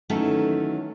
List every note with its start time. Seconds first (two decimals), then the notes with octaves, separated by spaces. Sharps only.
0.09 D#3 E3 F#3 A3 C#4 A4